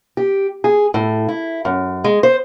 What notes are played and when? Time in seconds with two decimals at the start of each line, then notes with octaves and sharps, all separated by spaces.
0.17 G4
0.64 G#4
0.94 A2
1.28 E4
1.65 F#2
2.04 G#3
2.23 C5